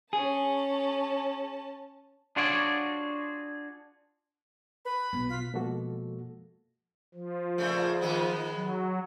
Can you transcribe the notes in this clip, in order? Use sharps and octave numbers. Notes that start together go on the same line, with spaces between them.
C#4 G#4 A5
D4 F4 F#4 G#4 C#5 D5
B4 B5
B1 B3
F4 B6
B2 F3 G#3 A#3 F#4 A4
F3
A#2 C#3 A3
D#3 G#3 B3
F#3